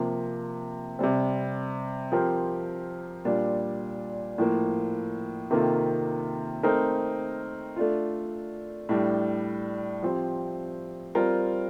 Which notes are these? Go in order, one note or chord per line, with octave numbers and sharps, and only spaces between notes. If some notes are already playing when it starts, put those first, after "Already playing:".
Already playing: C3 F3 A#3
C3 G3 C4
F3 C4 G4 A#4
A#2 G3 D4 F4
A2 F3 A#3
C3 D#3 A#3 F4 A4
A3 C4 D#4 A#4
A3 D4 F4
A2 G3 D4
F3 C4 G4
G3 C4 F4 A#4